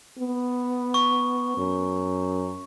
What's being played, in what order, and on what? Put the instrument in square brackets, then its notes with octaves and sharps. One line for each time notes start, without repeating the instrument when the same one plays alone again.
[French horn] B3
[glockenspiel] C#6
[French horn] F#2